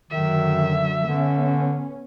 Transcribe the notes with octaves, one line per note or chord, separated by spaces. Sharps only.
F#2 D3 D#3 F#3 E5
D3 B3 C#4